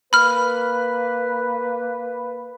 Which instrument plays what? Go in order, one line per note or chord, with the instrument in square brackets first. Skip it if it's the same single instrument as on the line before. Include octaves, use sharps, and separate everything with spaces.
[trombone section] A#3 B4 [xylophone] B5 F6